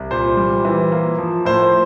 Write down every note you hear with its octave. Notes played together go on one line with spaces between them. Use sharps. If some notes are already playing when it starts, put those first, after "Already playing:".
Already playing: C2
A#2 C5
G3
E3
A#3
F3
A2 C5